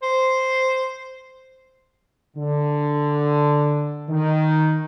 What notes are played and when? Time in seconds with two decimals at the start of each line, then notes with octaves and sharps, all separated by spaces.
0.03 C5
2.36 D3
4.09 D#3